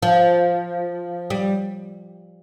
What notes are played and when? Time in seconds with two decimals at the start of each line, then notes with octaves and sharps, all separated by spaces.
0.02 F3
1.30 G3